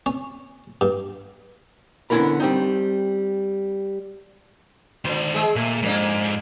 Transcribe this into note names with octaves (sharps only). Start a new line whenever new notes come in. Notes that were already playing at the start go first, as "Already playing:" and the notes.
C#4
G2
D3 B3 C#4 E4 A#4 B5
G3 C4 D#4
A#2 D3 D#3 C5
G#3 G#4
A#2 A3
F2 G#2 A#3 D4